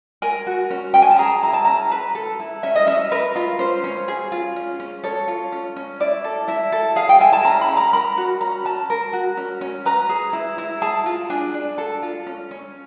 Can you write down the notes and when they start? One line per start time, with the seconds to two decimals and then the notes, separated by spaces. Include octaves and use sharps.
0.22 A#4 G#5
0.47 F#4
0.70 C#4
0.94 C#4 G5
1.02 G#5
1.11 A5
1.19 G#4 A#5
1.43 E4 A#5
1.53 A5
1.65 C#4 A#5
1.92 B4
2.15 A4
2.40 E4
2.63 C#4 E5
2.76 D#5
2.87 C#4 E5
3.12 A#4 B4
3.36 F4
3.59 C#4 C5
3.84 C#4
4.08 G#4
4.32 F4
4.56 C#4
4.80 C#4
5.04 A4 C#5
5.28 F4
5.52 C#4
5.76 C#4
6.00 E4 D5
6.24 A4
6.48 E4 E5
6.72 A4
6.96 G#4 F5
7.09 G5
7.20 E4 G#5
7.33 A5
7.44 C#4 A#5
7.61 B5
7.68 C#4
7.77 A#5
7.93 A#4 B5
8.17 F#4
8.41 C#4 A#5
8.65 C#4 A5
8.90 A#4
9.13 F#4
9.37 C#4
9.61 C#4
9.86 B4 A#5
10.09 G#4
10.33 E4
10.58 E4
10.81 G#4 A5
11.06 F4
11.30 D4 G#5
11.54 D4
11.78 A4
12.02 F4
12.26 C#4
12.51 C#4